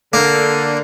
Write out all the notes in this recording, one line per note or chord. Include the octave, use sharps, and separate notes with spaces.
D3 A#3